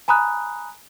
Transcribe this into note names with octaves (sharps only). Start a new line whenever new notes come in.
G#5 A#5 B5 D#6 F#6